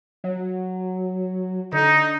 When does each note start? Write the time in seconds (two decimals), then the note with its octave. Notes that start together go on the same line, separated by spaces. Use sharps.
0.24 F#3
1.73 D3 D#4